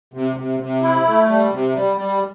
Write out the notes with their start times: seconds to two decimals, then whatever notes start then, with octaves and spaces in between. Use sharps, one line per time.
0.14 C3
0.36 C3
0.59 C3
0.82 E4
1.06 A3
1.28 G3
1.51 C3
1.75 G3
1.97 G3